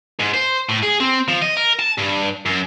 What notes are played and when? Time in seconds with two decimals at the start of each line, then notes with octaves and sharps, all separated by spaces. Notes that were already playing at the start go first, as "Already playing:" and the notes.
0.19 G#2
0.34 C5
0.69 A2
0.83 G#4
1.00 C4
1.28 F3
1.42 D#5
1.57 A#4
1.79 A5
1.98 G2
2.46 F#2